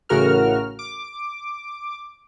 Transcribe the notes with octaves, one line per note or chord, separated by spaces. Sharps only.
A1 A2 C#3 F#4 A#4 F6
D6